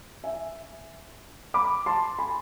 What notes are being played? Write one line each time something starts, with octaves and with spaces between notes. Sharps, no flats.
E5 G#5
B5 D6
A5 C6
G#5 B5